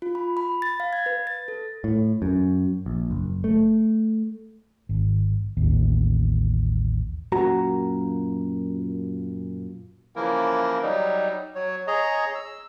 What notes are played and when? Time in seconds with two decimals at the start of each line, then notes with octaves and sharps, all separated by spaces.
0.02 F4
0.15 B5
0.37 B5
0.62 A6
0.80 F5
0.93 G#6
1.06 B4
1.27 A6
1.48 A4
1.84 A2
2.22 F#2
2.86 A#1
3.11 F#1
3.44 A3
4.89 G#1
5.57 A1 D#2
7.32 F#2 A#2 F#4 A#5
10.16 C#3 E3 F3 A#3 E4 A#4
10.83 F#3 G3 D#4
11.55 F#3 C#5
11.87 G#4 C#5 D#5 A#5
12.35 E6